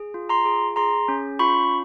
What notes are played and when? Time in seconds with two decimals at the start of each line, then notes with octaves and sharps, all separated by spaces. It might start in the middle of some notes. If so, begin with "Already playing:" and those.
Already playing: G#4
0.14 F4
0.29 A#5 C6
0.45 G#4
0.76 G#4 A#5 C6
1.08 C#4
1.39 F4 B5 C#6